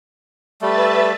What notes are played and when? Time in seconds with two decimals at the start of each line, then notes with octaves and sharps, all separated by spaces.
0.62 G3 A3 B4 E5 A6